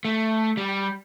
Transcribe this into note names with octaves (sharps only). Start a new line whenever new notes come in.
A3
G3